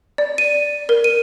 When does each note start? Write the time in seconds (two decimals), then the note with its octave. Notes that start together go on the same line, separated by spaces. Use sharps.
0.18 D5
0.38 D#7
0.89 A#4
1.04 D#7